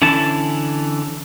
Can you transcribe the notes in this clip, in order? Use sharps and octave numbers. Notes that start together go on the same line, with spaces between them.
D3 E3 C#4 E4 A5